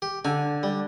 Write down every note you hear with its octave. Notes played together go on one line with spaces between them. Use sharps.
G4
D3 G#5
G3